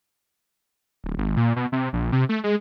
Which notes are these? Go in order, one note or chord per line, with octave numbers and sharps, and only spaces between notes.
D1
G#1
A#2
B2
C3
A#1
C3
A3
G#3